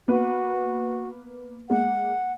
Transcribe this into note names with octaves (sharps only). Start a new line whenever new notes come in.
A#3 B3 F#4 B4
G#3 A#3 F#5